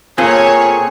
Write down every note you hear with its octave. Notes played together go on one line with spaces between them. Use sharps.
A#2 C4 G#4 A4 C#5 G#5